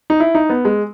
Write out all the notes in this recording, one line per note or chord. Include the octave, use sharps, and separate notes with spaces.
D#4
E4
D#4
B3
G#3